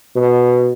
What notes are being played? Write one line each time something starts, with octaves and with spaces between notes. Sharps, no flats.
B2